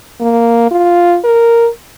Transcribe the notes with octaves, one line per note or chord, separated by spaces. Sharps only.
A#3
F4
A#4